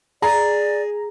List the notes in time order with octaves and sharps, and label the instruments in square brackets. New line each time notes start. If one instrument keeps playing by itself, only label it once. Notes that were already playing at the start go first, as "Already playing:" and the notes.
[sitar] G#4 [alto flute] D5 [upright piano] A#5